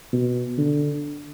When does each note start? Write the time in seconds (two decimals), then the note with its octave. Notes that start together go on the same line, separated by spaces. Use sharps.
0.13 B2
0.58 D3